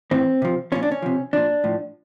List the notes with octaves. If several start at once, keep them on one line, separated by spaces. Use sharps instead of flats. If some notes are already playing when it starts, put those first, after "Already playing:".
A2 E3 C4
C3 F3
A#2 F3 C#4
D4
C#4
C3 F3
A#2 F3 D4
A2 F3